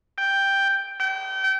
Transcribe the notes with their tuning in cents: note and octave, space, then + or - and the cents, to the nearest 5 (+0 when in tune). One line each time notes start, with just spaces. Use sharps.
G5 +5
G5 -30